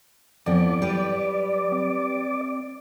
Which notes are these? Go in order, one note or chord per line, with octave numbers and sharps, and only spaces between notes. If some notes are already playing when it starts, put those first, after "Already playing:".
F2 E3 B3 D5
F#3 G3 B4
C4